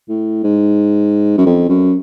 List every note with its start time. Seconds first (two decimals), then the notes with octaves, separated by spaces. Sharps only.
0.09 A2
0.43 G#2
1.38 F#2
1.46 F2
1.69 F#2